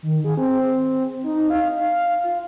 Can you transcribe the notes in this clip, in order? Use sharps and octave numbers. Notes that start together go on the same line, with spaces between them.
D#3
G#4
C4
D#4
F5
F5
F4